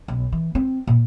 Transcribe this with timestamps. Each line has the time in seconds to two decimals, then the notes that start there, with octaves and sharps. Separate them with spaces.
0.08 B1
0.32 E3
0.55 C4
0.87 A#2